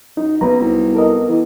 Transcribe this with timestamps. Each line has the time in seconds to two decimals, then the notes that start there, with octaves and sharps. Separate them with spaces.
0.17 F#2 D#4
0.41 F#3 B3 B4 A#5
0.60 C2 C4
0.95 A4 A#4 D#5
1.28 E3